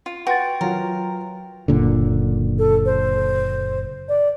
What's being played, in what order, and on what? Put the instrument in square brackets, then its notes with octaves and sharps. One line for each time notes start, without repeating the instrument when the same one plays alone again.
[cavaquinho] F4
[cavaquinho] F#4 [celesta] B4 C6 A6 [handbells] G5
[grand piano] F#3 F4 [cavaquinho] A#4
[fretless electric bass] F#1 A#2 D3
[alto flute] A4
C5
D5